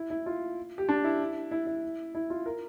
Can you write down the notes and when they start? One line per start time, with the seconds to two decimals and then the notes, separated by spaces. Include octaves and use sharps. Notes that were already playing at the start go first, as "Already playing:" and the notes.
Already playing: E4
0.10 E4
0.26 F4
0.78 G4
0.89 D4
1.04 E4
1.51 E4
1.67 E4
2.15 E4
2.30 F4
2.46 A#4